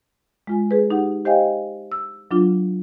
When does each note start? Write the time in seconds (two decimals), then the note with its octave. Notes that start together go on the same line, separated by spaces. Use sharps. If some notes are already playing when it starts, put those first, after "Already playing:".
0.47 G#3 F4 G#5
0.71 G#4 B4
0.90 D#4 G4 F#5
1.25 G4 C5 D#5 F5 G5 G#5
1.92 E6
2.31 F#3 D4 F4